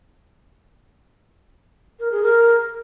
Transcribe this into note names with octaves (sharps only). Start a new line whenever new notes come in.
A#4
G#4
A#4